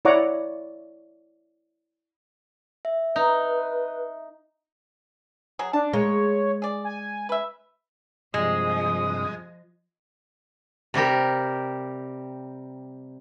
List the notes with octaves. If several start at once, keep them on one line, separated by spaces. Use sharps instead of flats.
E4 C#5 D5 F#5 A#5 D6
E5
D#4 B4
F#3 G#4
D4 A5
G#3 A#3 C#5
G#4 D5
G#5
B4 E5
G2 C3 F3 G#3 D#6
C3 G3 G4 A#4